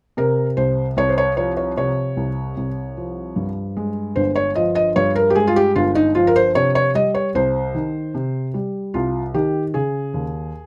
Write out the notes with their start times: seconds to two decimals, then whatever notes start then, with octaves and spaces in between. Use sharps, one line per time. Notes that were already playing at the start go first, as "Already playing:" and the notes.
0.17 C3 A#4
0.57 C2 C5
0.97 C2 C#5
1.09 C5
1.18 C#5
1.37 F3 C#5
1.57 C#5
1.77 C3 C#5
2.17 C2
2.57 C2
2.97 F3
3.36 G2
3.77 G#3
4.16 G1 C5
4.36 C#5
4.55 F3 D#5
4.75 D#5
4.96 G2 C#5
5.16 A#4
5.30 G4
5.35 G#3 G#4
5.47 F4
5.56 G4
5.75 G1 F4
5.95 D#4
6.15 F3 F4
6.27 A#4
6.36 C5
6.55 C3 C#5
6.75 C#5
6.95 G3 D#5
7.14 C#5
7.35 C2 C5
7.75 D#3
8.14 C3
8.54 G3
8.94 C2 F4
9.34 D#3 G4
9.74 C#3 G#4
10.14 D#2